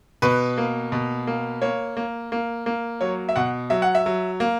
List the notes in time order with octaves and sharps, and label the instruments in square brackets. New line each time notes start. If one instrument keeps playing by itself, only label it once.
[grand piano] B2 B4
A#3
B2
A#3
A#3 C#5
A#3
A#3
A#3
F#3 C#5
E5
B2 F#5
F#3 E5
F#5
E5
F#3
A#3